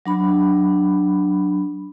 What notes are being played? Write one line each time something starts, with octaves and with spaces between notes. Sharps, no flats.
F#3 D4 B5